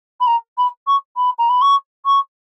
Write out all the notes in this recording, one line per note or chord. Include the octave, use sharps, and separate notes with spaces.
B5
A#5
B5
C#6
B5
A#5
B5
C#6
C#6